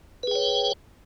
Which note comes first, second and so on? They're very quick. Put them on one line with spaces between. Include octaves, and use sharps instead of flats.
B4 G#4 G5 C#5